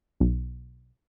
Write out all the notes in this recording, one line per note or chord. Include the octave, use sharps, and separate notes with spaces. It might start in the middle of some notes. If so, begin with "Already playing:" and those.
B1